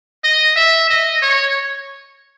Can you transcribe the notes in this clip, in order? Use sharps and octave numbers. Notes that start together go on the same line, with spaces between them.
D#5
E5
D#5
C#5